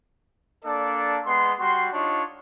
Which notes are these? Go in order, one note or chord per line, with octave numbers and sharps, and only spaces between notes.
A#3 D4 A4 D5
G#3 B3 C6
G3 F#4 C6
D4 D#4 F4 C#5